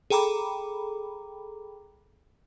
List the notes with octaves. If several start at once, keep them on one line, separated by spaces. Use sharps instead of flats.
G#4 A4 G5 A#5 B5 D6